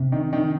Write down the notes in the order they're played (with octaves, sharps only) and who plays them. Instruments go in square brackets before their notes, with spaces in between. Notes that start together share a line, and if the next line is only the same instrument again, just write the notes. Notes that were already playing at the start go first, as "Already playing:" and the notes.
Already playing: [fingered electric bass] C3
[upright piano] D#3
D#3